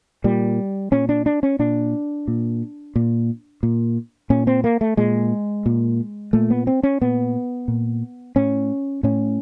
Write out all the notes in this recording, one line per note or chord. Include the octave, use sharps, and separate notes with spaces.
A#2 G3
A#2 C#4
D4
D4
C#4
A#2 D4
A#2
A#2
A#2
A#2 C#4
C4
A#3
A3
A#2 G#3
A#2
A#2 A3
B3
C4
C#4
A#2 B3
A#2
A2 C#4
A2 C#4